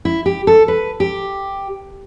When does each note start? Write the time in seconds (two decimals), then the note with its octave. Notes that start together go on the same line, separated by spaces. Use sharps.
0.05 E4
0.26 G4
0.47 A4
0.68 B4
1.00 G4